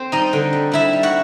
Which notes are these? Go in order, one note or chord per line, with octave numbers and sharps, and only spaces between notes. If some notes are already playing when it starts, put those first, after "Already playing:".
Already playing: C4 C5
G3 D#4 D#5
D3
G3
G3 E4 E5
G3
F#4 F#5